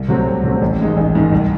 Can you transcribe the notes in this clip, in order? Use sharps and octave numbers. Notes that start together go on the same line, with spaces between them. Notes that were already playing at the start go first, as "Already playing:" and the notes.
Already playing: C2
C3 F#3 A3 C4
C2
C3 F#3 A3 C4
A1
G#2 D#3 G#3 D#4
A1
G#2 D#3 G#3 D#4
C2